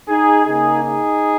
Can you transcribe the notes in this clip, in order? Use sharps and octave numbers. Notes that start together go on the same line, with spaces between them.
D#4 G#4
C#3 A#3 D#4 G#4
D#4 G#4